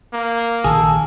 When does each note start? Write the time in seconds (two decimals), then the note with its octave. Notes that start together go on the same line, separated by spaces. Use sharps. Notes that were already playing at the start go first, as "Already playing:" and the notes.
0.13 A#3
0.64 A#1 D#3 G#4 A4